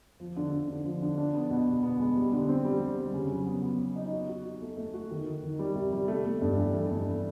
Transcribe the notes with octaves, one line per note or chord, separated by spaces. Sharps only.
F3
D3
D3
D3
F3
D3
D4
B3
B2
B2
B3
G#3
G3
D3
C4
G3
G3
G3
C#3
F#3
B3
B3
B3
D#4
F#4
F#4
F#4
A3
A3
F#4
D#3
D#3
D#3
G3
C3
G3
A3
A3
G2
E3
A3
G2